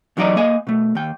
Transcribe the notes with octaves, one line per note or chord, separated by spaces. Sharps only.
E2 F#3 D#4 D5 D#5 A#5
A#3 D#5 G#5
B2 A3
D#2 G5